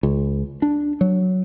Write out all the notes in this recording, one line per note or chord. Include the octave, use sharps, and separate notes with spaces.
C#2
D4
F#3